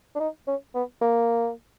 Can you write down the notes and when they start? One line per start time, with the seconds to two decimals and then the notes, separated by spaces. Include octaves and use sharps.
0.15 D4
0.20 D#4
0.47 C#4
0.75 B3
1.02 A#3